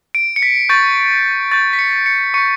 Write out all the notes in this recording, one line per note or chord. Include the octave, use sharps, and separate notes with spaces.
D7
C#7
B6
C#6 G6 A6
C#6 G6 A6
B6
C#7
C#7
C#6 G6 C#7